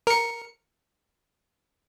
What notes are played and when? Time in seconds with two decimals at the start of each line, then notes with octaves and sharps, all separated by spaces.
0.07 A#4 C#7